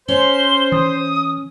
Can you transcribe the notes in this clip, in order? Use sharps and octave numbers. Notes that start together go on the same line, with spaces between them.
C#4 C5 G7
E3 D#6